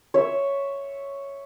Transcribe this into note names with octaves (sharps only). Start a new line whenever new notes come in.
C#5 E5